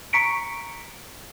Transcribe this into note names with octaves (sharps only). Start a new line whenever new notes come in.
A#5 C#6 B6 C#7 D7